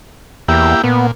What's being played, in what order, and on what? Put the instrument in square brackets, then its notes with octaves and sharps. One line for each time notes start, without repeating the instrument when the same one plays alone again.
[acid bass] E2 [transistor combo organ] A#3 E4 G4
[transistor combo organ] A#2 [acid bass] B3